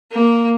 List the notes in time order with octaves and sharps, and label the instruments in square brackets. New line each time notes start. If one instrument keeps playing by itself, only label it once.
[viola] A#3